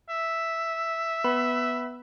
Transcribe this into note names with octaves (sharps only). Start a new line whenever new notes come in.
E5
B3 B4 B5